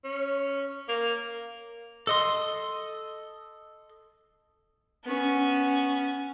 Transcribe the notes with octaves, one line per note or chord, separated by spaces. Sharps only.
C#4
A#3
A4 D#5 C6
B3 C#4